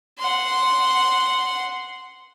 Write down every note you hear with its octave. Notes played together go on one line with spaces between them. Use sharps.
F#5 C6